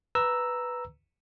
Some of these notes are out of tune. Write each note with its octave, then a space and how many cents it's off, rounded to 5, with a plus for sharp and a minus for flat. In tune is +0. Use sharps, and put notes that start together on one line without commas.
B4 +0 A#5 +0 E6 +0